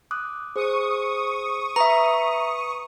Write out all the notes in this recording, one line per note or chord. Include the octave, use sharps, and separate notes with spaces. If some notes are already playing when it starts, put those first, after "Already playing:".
D6 D#6 F#6
G#4 C5 C#6 D#6
B4 E5 A#5